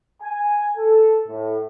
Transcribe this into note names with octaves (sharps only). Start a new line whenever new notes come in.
G#5
A4
A2